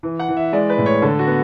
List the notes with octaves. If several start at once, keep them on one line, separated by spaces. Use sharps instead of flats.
E3
F#5
E3
E5
G#3 D5
B4
A2
C#5
D3 A4
F#4
B3